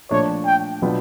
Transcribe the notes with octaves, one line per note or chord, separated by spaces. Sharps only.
A#2 F3 A3 D4 C#5
G5
B2 F#3 B3 D4 F4